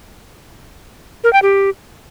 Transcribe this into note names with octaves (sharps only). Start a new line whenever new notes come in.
A#4
G5
G4